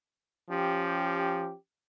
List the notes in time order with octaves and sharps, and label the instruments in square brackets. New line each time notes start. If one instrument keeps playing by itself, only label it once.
[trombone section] F3 C#4 G4